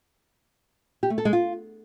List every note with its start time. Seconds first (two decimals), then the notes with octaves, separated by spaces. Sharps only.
1.03 G4
1.10 A3
1.18 A4
1.25 G#3
1.33 F4